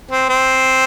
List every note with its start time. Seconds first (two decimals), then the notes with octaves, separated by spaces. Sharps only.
0.11 C4
0.29 C4